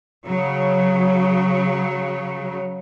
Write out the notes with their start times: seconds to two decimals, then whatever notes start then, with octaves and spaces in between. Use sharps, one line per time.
0.25 C#3 F#3